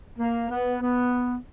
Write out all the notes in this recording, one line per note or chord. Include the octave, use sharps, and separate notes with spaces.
A#3
B3
B3